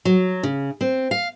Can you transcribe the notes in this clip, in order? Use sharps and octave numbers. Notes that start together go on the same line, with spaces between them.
F#3
C#3
C4
F5